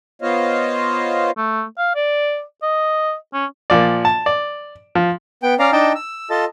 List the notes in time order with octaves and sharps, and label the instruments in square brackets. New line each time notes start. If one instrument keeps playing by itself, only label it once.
[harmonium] B3 F4 C5 C#5 D#5 F5
[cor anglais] A3
F5
D5
D#5
C#4
[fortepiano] A#2 F3 D5
A5
D5
F3
[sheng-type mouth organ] B3 G5
C#4 D5 F5 A#5
D4 D#4 D#5 G5 A5
E6
F4 A4 D#5 A5